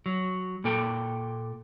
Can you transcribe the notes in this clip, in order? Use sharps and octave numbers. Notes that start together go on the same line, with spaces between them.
F#3
A#2 A#3 A4 G5